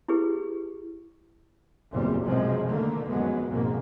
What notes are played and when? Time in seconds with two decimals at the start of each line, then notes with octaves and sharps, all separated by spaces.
0.08 E4 G4 G#4 B4
1.92 F#1 E2 A#2 G3 C4
2.24 B1 F#2 C3 F3 G#3 C4
2.67 D3 D#3 A3 A#3
3.08 F1 F#2 F#3 G#3 B3
3.49 B1 F2 G#2 C#3 A#3